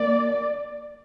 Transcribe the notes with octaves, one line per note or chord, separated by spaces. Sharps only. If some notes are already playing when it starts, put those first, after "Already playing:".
Already playing: A#3 D5